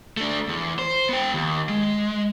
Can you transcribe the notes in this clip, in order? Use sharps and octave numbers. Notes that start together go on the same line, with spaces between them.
A3 D4
E2
C5
B3 G5
D#2
G#3